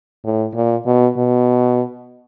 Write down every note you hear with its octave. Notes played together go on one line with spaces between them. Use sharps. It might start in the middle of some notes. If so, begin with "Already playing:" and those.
A2
A#2
B2
B2